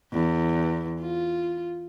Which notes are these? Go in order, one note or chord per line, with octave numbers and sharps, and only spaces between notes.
E2
F4